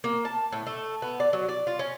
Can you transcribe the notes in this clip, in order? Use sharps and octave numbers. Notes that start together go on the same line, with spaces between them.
A#3
A5
A2
A3
B3
D5
F#3
D5
F4
C#4